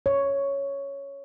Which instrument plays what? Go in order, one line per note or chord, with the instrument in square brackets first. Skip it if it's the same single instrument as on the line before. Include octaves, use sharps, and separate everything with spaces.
[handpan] C#5